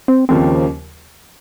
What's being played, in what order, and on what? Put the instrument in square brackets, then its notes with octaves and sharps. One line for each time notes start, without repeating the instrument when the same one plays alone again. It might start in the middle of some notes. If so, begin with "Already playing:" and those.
[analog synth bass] C4
[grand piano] D#2 C#3 F3 A#3 [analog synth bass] C4